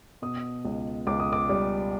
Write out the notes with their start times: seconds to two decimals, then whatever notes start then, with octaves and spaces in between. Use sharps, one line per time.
0.22 B2 D#6
0.65 C#2
1.07 C#2 D6
1.20 D#6
1.33 D6
1.49 G3